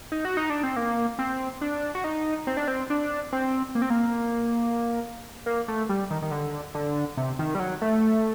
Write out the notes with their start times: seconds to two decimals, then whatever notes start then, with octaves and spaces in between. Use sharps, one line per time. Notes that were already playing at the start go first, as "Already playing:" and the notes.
0.12 D#4
0.25 F#4
0.37 D#4
0.50 D4
0.63 C4
0.76 A#3
1.19 C4
1.61 D4
1.95 F#4
2.04 D#4
2.47 C4
2.57 D4
2.68 C4
2.90 D4
3.33 C4
3.75 A#3
3.82 C4
3.90 A#3
5.46 A#3
5.68 A3
5.89 G3
6.11 D#3
6.22 D#3
6.31 D3
6.75 D3
7.17 C3
7.39 D#3
7.55 G3
7.59 F#3
7.82 A3